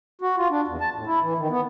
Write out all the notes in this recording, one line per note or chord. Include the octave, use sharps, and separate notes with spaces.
F#4
F4
D4
E2
A5
A2
E4
E3
D#3
B3